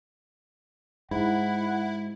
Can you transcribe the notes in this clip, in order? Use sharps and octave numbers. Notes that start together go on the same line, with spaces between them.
G#2 E4 F#5